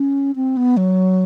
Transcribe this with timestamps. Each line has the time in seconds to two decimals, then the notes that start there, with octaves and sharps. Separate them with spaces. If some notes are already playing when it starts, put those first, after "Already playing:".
Already playing: C#4
0.36 C4
0.57 B3
0.77 F#3